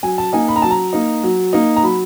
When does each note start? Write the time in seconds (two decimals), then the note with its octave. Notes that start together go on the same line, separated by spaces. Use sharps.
0.03 F#3 G#5
0.18 A5
0.33 A#3 D#4 G#5
0.48 B5
0.56 A#5
0.62 F#3 A5
0.71 A#5
0.93 A#3 D#4
1.23 F#3
1.53 A#3 D#4
1.76 A#5
1.83 F#3 B5